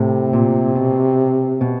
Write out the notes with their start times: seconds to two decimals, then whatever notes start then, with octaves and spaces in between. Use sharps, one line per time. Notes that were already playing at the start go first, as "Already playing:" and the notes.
Already playing: A2 C3
0.33 A#2
0.75 B2
1.61 B2